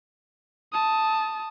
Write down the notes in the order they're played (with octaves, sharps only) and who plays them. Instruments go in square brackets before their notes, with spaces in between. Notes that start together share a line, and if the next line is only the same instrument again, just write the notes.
[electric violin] A5 D#6